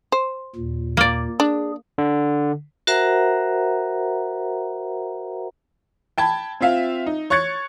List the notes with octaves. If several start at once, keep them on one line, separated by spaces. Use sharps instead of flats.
C5
D#2 A#2
A#3 D5
D4 G#4
D3
F#4 A#4 C5 E5 F#5 A#5
G5 A5 B5 G#6
C4 F4 E5 F5
D#4
C#5 C#6 F#6 G#6 A6 C#7